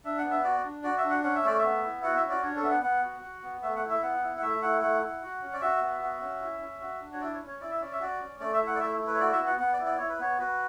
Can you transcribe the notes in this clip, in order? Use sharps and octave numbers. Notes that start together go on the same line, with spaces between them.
D4 E5
F#5
B3
E5
F#4 D5
D4
F#4 D5
E5
D4
F#5
C#4 F#5
E5
A3 D5
E5
B3
E4
F#4 F#5
E5
C#4
D5
D4 C#5
A4
B3 E5
F#5
B3 F#5
F#4
F#4
B3
A3 E5
F#5
E4
E5
B3 F#5
E4
F#5
A3 E5
E4 F#5
A3 F#5
E4
F#4
C#4
D5
F#4 E5
B3
F#4
C#4
E4
C#4
F#4
D4
C#5
E4 D5
C#5
C#4
C#5
E4 D5
E5
C#4 D5
E5
F#4 D5
C#4
A3 D5
E5
E4
F#5
D5
A3 E5
E4
B4
C#5
F#4 D5
E5
B3
F#5
B3 F#5
D5
E4
D5
E4 C#5
B4
B3 C#5
F#4 B4